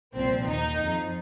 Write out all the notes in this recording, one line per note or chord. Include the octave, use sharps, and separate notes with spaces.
C2 A#2 F3 C4
D#2 D#3 D#4
F2 F3